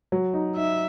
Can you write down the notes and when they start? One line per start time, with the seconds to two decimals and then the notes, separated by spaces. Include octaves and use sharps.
0.12 F#3
0.34 D#4
0.56 D#4 E5